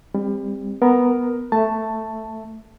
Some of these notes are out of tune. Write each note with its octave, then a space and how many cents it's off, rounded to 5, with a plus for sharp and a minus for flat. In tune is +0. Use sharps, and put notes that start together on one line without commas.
G3 +30 C4 +0
B3 +0 A#4 +10 A#5 +0
A3 +10 E5 +0 A5 +5